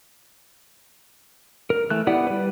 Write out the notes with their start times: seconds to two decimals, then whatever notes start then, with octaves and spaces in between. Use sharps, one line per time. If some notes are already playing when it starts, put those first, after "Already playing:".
1.70 A#4
1.90 E3 A3 F#6
2.07 B3 E4 G4 D5 F#5
2.27 G3 B4